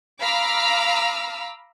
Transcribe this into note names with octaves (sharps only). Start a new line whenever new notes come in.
F5 A#5 B5 D6 E6 F6